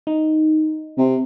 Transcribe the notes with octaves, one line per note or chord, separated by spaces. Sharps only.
D#4
C3